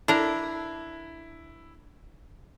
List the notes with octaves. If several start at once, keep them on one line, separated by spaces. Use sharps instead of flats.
D4 E4 A#4